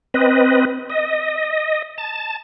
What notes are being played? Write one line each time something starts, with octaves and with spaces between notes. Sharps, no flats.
C4 B4 D#5
D#5
A5